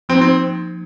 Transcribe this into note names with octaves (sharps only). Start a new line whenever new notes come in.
F3 A#3 C4 D#4
C4